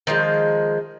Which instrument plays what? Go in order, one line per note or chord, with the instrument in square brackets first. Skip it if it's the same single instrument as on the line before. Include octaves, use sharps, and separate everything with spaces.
[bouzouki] D#3 F3 G#3